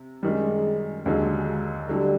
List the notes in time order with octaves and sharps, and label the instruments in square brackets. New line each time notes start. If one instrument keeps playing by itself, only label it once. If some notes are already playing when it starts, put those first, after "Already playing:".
Already playing: [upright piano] C3
[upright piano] F#2 D#3 G3 [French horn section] G#3
[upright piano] D#2 D3 F#3 [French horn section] G#3
[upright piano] D3 F#3 A3 [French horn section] G3